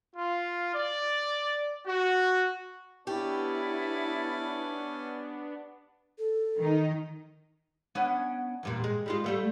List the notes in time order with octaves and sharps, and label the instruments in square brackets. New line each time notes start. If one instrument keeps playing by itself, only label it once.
[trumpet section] F4
D5
F#4
[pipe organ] B3 D4 [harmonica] C#4 D5 A5 [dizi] E4 [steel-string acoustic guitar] G4
[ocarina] A4
[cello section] D#3 D#4
[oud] B3 C#4 D4
E2 G2 A#2
G#3
G3 G#3 F4
G3 A3 B3